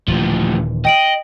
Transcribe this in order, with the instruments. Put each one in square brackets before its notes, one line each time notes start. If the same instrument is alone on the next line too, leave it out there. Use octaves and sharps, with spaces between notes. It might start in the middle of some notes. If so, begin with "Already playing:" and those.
[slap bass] D#1 D3 E3 [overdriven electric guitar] A2 F3
[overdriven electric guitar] D#5 [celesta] G5 D7 F#7